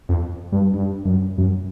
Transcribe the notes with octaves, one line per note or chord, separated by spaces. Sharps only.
F2
G2
G2
F#2
F#2